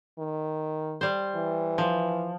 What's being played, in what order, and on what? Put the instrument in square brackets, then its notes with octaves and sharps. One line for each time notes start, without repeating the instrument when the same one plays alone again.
[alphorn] D#3
[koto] G3 C5
[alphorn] E3
[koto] F3